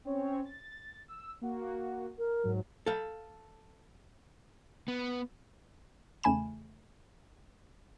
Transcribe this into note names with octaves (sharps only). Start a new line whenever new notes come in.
C4 C#4 C#5
A6
E6
A#3 F#4
A#4
G#2 F#3
A4 F5
B3
E2 C#3 A3 G#5 B5 E7